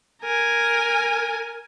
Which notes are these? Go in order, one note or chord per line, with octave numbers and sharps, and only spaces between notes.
A#4 G#5